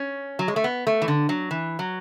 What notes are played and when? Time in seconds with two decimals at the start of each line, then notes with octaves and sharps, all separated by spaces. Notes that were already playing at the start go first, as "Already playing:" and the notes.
Already playing: C#4
0.39 F#3
0.48 G#3
0.56 A3
0.64 B3
0.87 A3
1.02 E3
1.08 D3
1.29 F#3
1.51 E3
1.79 F#3